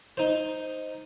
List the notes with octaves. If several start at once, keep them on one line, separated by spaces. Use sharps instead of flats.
D#4 C5